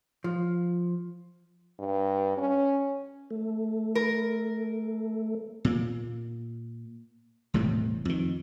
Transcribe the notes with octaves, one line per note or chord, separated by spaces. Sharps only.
F3
G2
C#4
A3
A#4
A#2 A#3
E1 A2 C3 G3
F2 D#3